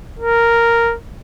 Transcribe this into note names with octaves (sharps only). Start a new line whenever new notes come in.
A#4